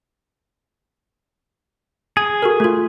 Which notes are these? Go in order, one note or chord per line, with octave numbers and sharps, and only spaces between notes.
G#4 G#5 G#6
F#4 A4 A#4
A3 F4